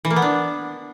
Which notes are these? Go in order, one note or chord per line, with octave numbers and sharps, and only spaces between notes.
E3
A#3
B3
D4